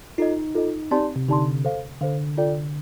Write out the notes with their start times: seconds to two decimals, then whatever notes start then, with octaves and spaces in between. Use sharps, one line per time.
0.18 D#4 F4 A4 D#5
0.55 F4 A4 D#5
0.91 C4 D#4 G4 D5 A5 C6
1.16 C3
1.28 D3 D#4 G4 D5 A5 C6
1.64 A4 C5 F5
2.01 D3 A4 C5 F5
2.37 F4 A4 D5 G5